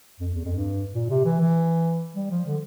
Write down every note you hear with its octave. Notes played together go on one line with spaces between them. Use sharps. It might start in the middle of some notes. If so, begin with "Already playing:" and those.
F2
E2
F2
G2
A#2
C3
E3
E3
G3
F3
D3